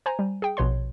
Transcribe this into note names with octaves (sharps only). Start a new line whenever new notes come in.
C5 G#5 A#5
G3
G#4 G5
A#1 B2 B4 C#5 C6